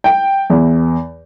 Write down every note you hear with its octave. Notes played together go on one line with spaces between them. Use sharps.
G5
E2